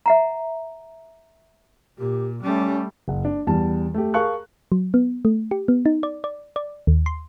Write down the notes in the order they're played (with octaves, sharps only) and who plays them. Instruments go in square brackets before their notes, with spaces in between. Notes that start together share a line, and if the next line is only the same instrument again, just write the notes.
[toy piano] E5 F#5 A#5
[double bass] A#2 [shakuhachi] G4
[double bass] G3 A3 [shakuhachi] C#4
[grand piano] F#1 F#5
D4
E2 G3 A5
A3 G4
G#4 A#4 F5 A5 C#6 F#6
[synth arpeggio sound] F#3
B3
A3
G4
B3
D#4
D5
D5
D5
D#2
C6